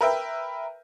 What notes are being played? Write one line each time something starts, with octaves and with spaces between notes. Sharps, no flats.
A#4 B4 E5 G5